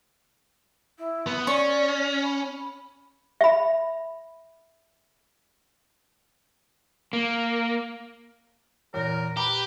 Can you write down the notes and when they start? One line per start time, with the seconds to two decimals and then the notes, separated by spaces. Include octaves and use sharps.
0.98 E4
1.27 B3
1.47 C#4 D5 C#6
2.24 B5
3.41 E5 B5
7.13 A#3
8.94 E2 A#2 A#4 C#5
9.37 G4 B4 A#5